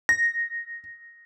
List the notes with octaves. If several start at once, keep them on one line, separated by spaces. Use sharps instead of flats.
A#6